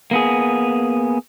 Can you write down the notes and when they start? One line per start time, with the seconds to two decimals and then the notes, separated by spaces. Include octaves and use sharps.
0.11 A#3 B3 G#4